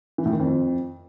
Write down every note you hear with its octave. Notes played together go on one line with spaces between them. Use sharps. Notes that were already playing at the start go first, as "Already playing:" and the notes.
E3
A2
D#3
F2